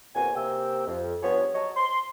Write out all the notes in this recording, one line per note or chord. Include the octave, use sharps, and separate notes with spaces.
E2 A#2 C4 F#4 G#5
C3 A#3 G5 E6
F2
G2 F3 B3 C4 G#4 C#5
F#3 C#5 D#5 A5
C6